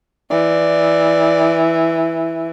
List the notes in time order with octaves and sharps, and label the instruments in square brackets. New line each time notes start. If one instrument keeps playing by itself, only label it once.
[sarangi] E3 [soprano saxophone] D5